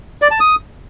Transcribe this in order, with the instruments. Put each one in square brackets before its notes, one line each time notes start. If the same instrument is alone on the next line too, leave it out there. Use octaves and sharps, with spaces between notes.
[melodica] D5
A5
D#6